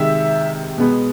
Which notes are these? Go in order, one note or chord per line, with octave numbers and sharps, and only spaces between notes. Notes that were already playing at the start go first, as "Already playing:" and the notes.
Already playing: C3 D#3 G#3 E5
B2 G#3 B3